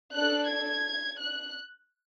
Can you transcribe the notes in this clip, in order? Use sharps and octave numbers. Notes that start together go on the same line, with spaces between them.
D4 A4 F#6
G#6
F#6